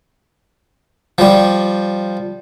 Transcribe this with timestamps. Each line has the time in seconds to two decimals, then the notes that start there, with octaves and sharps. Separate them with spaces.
1.18 F3 G3